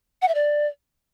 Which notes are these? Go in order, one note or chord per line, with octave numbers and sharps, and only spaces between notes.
F#5
E5
D5